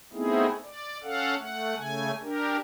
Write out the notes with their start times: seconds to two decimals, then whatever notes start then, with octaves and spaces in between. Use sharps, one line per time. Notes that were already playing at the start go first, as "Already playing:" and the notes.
0.13 A3 B3 C4 D#4 E4 G#4
0.64 D5
1.03 C#4 A4 F5 F#5
1.38 A3 F#5
1.76 C#3 A3 G#5
2.22 D4 G4 A#4